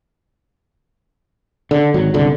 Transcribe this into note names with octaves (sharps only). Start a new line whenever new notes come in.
D3
G#1 F#3
G1 C2 D3